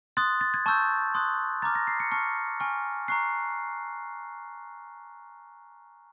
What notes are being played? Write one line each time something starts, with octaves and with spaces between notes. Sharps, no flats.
C6 D#6 F#6 A6
A6
G#6
A5 C#6 E6 G6
C6 D#6 F#6
A#5 D6 F6 A6
A#6
C7
C#7
A5 C#6 F6 C#7
G#5 C#6 F6
A#5 C#6 F#6 C7